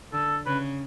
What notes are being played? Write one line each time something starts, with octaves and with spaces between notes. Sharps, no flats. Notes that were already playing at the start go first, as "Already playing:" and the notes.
D3 A4
C#3 B4